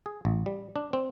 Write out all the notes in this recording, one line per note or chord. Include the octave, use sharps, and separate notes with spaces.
G#4
A1
G3
D4
C4